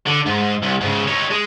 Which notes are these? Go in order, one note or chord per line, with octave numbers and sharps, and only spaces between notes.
D3
G#2
C2
G#2 C#3
D#4 C#5
G#3